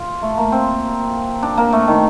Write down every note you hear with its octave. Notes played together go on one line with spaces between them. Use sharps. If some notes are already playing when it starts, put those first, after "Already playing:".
Already playing: F4
A3
A#3
C4
D4
A#3
A3
D#3